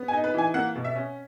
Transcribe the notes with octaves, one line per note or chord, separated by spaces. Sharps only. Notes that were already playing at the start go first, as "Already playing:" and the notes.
Already playing: B3
G#5
D#4
B4
E3 G#5
A#3 F#5
B2
E5
C#4